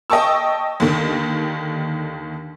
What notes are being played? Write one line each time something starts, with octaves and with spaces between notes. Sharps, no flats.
D#5 G5 A5 C#6 E6
D#2 D3 D#3